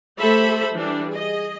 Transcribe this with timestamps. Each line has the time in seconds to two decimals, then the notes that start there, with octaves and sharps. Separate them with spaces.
0.19 A3 G4 A4 C5 E5 B5
0.73 E3 G3 D4
1.10 G#4 D#5